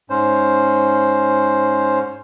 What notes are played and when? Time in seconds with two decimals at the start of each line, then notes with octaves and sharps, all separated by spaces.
0.10 G#2 C#4 C5